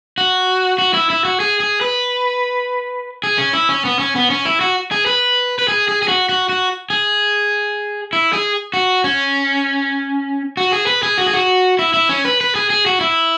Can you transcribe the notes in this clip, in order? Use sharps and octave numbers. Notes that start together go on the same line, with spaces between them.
F#4
F#4
E4
E4
F#4
G#4
G#4
B4
G#4
C#4
E4
C#4
B3
C#4
B3
C#4
E4
F#4
G#4
B4
B4
G#4
G#4
G#4
F#4
F#4
F#4
G#4
E4
G#4
F#4
C#4
F#4
G#4
B4
G#4
F#4
G#4
F#4
E4
E4
C#4
B4
B4
G#4
G#4
F#4
E4